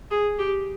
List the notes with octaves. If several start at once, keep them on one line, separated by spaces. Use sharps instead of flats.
G#4
G4